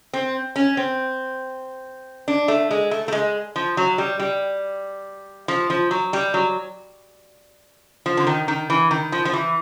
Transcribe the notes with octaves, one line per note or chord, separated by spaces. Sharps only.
C4
C#4
C4
D4
A3
G#3
A3
A3
G#3
F3
F#3
G3
G3
F3
F3
F#3
G3
F#3
F3
D3
D#3
D#3
E3
D#3
F3
F3
E3